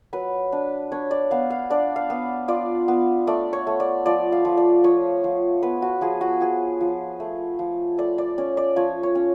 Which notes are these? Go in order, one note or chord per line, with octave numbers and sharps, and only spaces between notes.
F#3 B4
D4
D4 C#5
D5
B3 F5
F5
D4 D5
F5
B3
F4 D5
B3
A3 D5
C#5
A3
D5
F3 D5
F5
F3
D5
F3 C#5
F3
B3 B4
F#4
F3 G#4
F#4
F3 G#4
F3
A3
F3
A3 D5
D5
C#4 D5
D5
F3 C#5
C#5
C#4